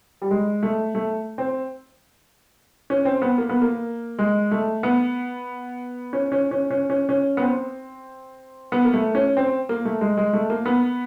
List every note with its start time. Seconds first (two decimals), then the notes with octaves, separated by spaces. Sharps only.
0.22 G3
0.31 G#3
0.63 A3
0.95 A3
1.38 C4
2.90 C#4
3.05 C4
3.22 B3
3.38 A#3
3.49 B3
3.62 A#3
4.19 G#3
4.51 A3
4.83 B3
6.13 C#4
6.32 C#4
6.51 C#4
6.71 C#4
6.90 C#4
7.09 C#4
7.37 B3
7.42 C4
8.72 B3
8.85 A#3
8.93 A3
9.15 C#4
9.37 C4
9.69 A#3
9.85 A3
10.01 G#3
10.17 G#3
10.33 A3
10.50 A#3
10.66 B3